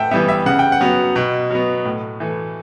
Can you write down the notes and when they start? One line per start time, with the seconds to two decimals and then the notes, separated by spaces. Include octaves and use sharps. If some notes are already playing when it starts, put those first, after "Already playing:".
Already playing: A2 E5 F#5 G5 A5
0.11 E3 G3 B3 E5
0.28 E5
0.46 C#3 F#5
0.59 G5
0.72 F#5
0.81 F#3 B3
1.16 B2
1.50 F#3 B3
1.85 A2
2.20 E3 A3